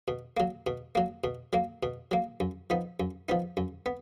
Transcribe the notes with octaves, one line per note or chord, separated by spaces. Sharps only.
B2
F#3 A#3
B2
F#3 A#3
B2
F#3 A#3
B2
F#3 A#3
F#2
F3 B3 D#4
F#2
F3 B3 D#4
F#2
B3